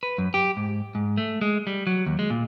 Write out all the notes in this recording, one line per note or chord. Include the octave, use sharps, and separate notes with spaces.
B4
F#2
G4
G#2
G#2
A3
G#3
G3
F#3
D#2
G#3
A#2